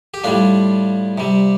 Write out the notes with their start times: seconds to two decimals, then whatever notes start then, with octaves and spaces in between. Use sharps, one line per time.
0.14 G4
0.24 A2 G3 D4 F4
1.18 C3 G3